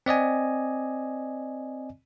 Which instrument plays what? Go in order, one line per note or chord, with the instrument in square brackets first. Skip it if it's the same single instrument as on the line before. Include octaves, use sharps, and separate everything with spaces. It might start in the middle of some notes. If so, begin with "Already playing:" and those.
[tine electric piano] C4 D5 D#5 G#5